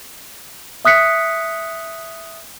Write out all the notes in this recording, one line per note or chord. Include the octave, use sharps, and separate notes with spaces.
E5 D#6 F#6 B6 C#7